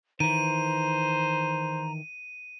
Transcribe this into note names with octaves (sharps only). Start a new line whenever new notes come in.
D#3 E3 C5 A#5 D#7